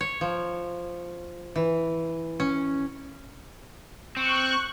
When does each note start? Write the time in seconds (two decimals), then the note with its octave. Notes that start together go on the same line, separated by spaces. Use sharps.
0.01 C#5
0.21 F3
1.56 E3
2.40 C#4
4.17 C4 C#6 F#6